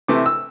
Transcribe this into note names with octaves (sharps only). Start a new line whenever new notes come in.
C3 E3 A3 D6
E6